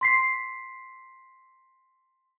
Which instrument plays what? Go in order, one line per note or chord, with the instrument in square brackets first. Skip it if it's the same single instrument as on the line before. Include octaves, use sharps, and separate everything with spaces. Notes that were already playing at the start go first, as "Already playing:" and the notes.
[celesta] C6 B6 C7